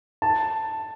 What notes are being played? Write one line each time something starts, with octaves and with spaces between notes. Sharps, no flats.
A5